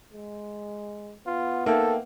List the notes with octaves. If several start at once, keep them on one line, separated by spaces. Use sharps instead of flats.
G#3
B3 F4
A#3 D#4 A4 E5 G5